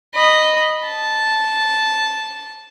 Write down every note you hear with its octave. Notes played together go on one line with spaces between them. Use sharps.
D#5 B5
A5